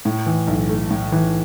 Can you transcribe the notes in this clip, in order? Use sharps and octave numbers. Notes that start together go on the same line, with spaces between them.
A2
E3
B1
A3
A2
E3